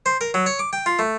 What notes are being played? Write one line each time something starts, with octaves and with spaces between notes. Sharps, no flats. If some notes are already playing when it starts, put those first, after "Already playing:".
C5
A#4
F#3
C#5
D6
G5
F4
A3